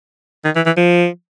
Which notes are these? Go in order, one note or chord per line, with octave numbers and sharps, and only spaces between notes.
D#3
E3
E3
F3